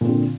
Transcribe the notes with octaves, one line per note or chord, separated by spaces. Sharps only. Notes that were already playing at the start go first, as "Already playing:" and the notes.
A#2 D3 C4